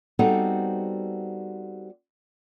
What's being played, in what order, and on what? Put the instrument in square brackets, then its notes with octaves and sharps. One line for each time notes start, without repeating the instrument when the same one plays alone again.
[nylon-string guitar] G3 B3 C4 D#4 F#4 A4